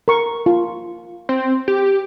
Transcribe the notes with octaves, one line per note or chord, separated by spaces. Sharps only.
A#4 C#6
F4
C4
G4